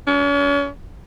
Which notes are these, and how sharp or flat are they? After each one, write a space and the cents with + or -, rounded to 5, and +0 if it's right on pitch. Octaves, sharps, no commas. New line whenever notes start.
C#4 +40